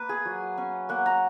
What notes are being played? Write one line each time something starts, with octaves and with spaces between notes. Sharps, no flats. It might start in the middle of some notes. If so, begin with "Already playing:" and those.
Already playing: A#3 B4
G#4
F#3
C#4
A#3 F#5
A#5